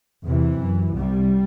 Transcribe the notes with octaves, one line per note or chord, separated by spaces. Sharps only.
E2 C3 E3
F#2
C2 C3 G3